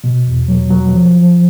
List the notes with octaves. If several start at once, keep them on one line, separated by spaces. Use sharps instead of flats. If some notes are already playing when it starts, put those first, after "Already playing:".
B2
E2
F#3
F#3
F3
F3